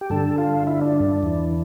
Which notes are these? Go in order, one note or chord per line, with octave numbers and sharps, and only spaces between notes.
G4
G2 D3 A4
F4
E4
D4
E2 E3